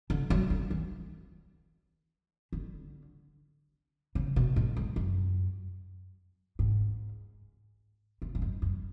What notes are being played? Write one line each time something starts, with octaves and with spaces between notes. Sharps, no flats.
D3
F#3
D3
E3
D3
C#3
B2
A2
G#2
F#2
G#2
A2
G#2
F#2
F#2